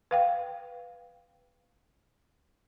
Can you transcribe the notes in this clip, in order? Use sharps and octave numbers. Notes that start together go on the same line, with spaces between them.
B4 F5 G5